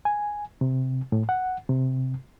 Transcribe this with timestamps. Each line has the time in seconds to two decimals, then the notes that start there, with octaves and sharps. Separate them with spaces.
0.05 G#5
0.61 C3
1.12 A2
1.29 F#5
1.69 C3